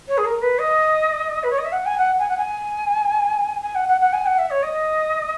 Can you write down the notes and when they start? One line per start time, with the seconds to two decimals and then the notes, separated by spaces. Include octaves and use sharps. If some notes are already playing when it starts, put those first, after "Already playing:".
0.08 C#5
0.17 G#4
0.25 A#4
0.41 B4
0.58 D#5
1.43 B4
1.50 C#5
1.58 D#5
1.64 E5
1.72 F#5
1.85 G#5
1.98 F#5
2.19 G#5
2.28 F#5
2.37 G#5
3.62 G#5
3.75 F#5
3.88 F#5
4.00 F#5
4.13 G#5
4.26 F#5
4.38 E5
4.50 C#5
4.62 D#5